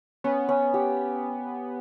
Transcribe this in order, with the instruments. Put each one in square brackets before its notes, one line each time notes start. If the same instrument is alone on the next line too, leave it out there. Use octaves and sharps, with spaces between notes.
[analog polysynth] B3 [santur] C#4
[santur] C#4
G4